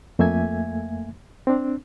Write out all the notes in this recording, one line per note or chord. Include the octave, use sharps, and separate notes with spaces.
F2 A3 A#3 E5 G#5 G#6
C4 D4